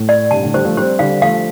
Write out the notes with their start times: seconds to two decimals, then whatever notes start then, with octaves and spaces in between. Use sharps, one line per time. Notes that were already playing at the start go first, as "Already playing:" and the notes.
Already playing: A2
0.09 D5
0.31 G2 C3 A5
0.43 A2 D3
0.54 D3 G3 C5
0.65 F3 A3
0.77 G3 C4 C5
0.99 D3 G3 F5
1.22 F3 A3 F5